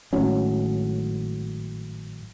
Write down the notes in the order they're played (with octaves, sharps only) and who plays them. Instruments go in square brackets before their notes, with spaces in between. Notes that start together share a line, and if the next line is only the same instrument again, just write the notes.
[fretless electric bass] G#1 A2 F#3 C#4